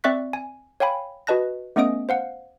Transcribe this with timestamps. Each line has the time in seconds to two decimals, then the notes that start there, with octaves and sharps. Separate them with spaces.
0.04 C4 D5 E5 C#6 F#6 B6
0.33 G#5
0.80 C#5 F5 G5 G#5 B5
1.27 F#4 B4 D#5 A5 F#6 A#6
1.76 A3 B3 C#4 D#5 D#6 D7
2.09 C5 F5 F#5